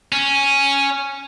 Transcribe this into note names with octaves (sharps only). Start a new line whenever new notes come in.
C#4